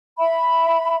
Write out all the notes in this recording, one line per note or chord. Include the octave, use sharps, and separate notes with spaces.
E5 B5